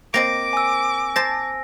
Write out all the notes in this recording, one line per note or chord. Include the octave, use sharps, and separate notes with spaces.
A#3 C4 D#5 D6 A#6 D7
G#5 E6
C5 A5 A#6